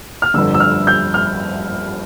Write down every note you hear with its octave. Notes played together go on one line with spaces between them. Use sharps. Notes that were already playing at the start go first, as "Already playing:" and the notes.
F6
G1 F2 D3 E6
E6
F6
G6
F6